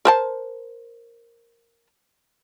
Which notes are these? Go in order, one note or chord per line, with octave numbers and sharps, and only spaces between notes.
A#4 C5 A5